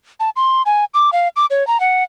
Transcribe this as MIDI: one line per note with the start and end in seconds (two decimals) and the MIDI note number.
0.20 0.30 81
0.36 0.62 84
0.66 0.85 80
0.94 1.10 86
1.13 1.28 77
1.36 1.46 86
1.50 1.66 73
1.67 1.80 82
1.80 2.04 78